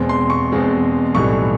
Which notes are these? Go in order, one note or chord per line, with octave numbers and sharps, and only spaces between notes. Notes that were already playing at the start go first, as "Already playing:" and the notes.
Already playing: E2 B2 G#3 C4
C6
C#6
E2 B2 G#3 C4
B1 A2 E3 G3 B3 C#6